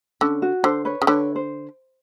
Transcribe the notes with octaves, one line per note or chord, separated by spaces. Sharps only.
D3 C#4
F#4
D3 C5
B4 C#5
C#3
D3 B4 C#5
C5